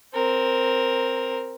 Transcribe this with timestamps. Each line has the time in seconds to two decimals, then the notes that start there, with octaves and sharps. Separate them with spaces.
0.14 C4 A#4